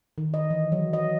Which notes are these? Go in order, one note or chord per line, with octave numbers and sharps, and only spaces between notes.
D#3
D#5
E3
F#3
D#5